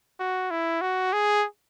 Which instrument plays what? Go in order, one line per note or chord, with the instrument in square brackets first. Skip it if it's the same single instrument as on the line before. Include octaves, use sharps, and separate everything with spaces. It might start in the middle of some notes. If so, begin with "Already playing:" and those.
[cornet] F#4
E4
F#4
G#4